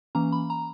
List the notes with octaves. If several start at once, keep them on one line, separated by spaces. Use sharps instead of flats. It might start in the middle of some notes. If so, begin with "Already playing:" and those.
E3 A#3 C#4 A#5
B5
A#5